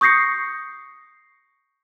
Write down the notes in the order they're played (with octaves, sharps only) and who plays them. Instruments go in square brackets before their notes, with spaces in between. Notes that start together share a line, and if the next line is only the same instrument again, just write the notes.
[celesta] C#6 D#6 G6 A#6 C7 C#7